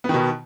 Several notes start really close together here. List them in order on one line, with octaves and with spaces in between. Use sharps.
B3 D#3 B2